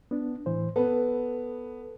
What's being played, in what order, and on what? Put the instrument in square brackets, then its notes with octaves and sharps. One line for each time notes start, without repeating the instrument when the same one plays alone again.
[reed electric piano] B3 D4
A2 E3 C5
[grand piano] B3 [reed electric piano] A4 B4